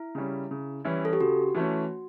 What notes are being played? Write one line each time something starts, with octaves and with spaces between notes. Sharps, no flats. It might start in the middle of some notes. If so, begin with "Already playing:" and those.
Already playing: E4
C#3 G3 C#4
C#3
E3 G3 C#4 E4
A4
G4
C#3 F#4
E3 A3 C#4